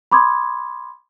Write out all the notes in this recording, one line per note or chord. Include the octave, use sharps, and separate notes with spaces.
B5 C6 D6 D#6 G#6